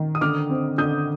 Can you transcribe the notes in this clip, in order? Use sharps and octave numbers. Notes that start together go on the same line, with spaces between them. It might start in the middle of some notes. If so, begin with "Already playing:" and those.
Already playing: D#3
D#6
D3 D6 F6
C4
D3 D#6 G6